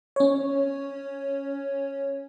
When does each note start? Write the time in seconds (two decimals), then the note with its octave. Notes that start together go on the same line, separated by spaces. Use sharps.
0.16 C#4 C#5